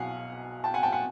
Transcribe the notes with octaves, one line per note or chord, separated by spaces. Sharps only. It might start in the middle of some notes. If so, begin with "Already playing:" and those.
Already playing: B1 B2 F#3 F5 F#5 G#5
G5 A5
F#5 G#5
G5 A5
F#5 G#5